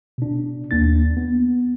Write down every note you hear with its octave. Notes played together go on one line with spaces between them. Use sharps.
B2 D4
D#2 A#3 D4 A6
B3